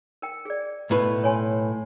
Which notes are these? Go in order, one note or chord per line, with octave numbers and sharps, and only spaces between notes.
A#4 G5
G#4 D5
B1 A2 B4
C#5 G#5 C6